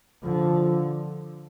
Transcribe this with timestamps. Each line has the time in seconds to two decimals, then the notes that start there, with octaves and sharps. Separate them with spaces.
0.24 D3 F3